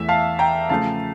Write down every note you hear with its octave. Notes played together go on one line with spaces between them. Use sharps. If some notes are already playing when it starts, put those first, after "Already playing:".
Already playing: E2 E3 A3 E5
F5 A5
G5 A#5
C#3 F3 A3 F5 A5